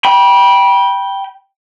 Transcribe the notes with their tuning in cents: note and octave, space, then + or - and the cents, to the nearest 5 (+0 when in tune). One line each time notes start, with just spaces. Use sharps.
G5 +0 B5 -25